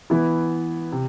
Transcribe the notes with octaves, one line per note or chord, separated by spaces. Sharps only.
E3 B3 E4
C3